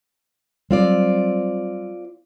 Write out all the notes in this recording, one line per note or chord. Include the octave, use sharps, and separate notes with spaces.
F#3 G3 C4 F4 D5